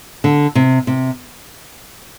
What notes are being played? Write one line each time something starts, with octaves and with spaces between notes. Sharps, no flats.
D3
C3
C3